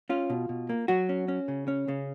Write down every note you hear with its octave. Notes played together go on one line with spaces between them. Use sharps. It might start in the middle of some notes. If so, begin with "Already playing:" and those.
C#4 F4
B2
B2
A#3
F#3 F#4
C#4
C#4
C#3
C#4
C#3